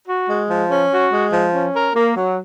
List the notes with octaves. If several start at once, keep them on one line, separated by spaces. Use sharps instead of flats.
F#4
G#3
F3
C#4
F#4
G#3
F3
C#4
A#4
A#3
F#3